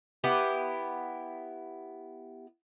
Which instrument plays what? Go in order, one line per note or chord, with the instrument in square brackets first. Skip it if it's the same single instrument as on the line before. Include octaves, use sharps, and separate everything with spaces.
[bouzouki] B3 E4 G4